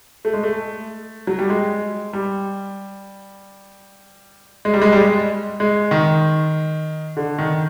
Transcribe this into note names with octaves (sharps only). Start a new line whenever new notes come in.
A3
G#3
A3
F#3
G3
G#3
G3
G#3
G3
G#3
G3
G#3
G#3
D#3
D3
D#3